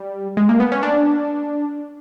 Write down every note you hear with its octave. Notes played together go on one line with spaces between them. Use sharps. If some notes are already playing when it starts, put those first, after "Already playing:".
Already playing: G3
G#3
A#3
B3
C#4
D4